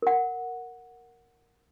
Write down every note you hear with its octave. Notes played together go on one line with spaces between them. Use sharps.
A#4 F#5